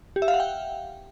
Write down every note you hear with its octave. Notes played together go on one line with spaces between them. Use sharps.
G4
E5
F5
F#5
G5